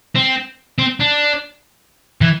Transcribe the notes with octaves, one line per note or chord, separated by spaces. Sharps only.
C4
C4
D4
E3